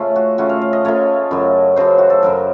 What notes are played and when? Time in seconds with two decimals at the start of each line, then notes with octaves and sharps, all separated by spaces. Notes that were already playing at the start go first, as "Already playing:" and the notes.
Already playing: C#3 A3 C#4 F4
0.16 F#4
0.38 C#3 A3 C#4 F4 F#4
0.49 F5
0.62 F5
0.73 D#5
0.85 C#3 A3 C#4 F4 C#5
1.31 F#2 C#3 F#3
1.76 F#2 C#3 F#3 C5
1.98 F#4
2.10 A4
2.22 F#2 C#3 F#3 A#4